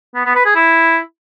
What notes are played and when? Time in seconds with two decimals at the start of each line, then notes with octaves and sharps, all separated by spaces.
0.15 B3
0.25 B3
0.35 B4
0.45 G#4
0.55 E4